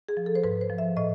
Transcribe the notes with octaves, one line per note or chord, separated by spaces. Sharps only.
G#4
F3
A4
C5
G#2 B4
C5
F3
E5
A2 D#5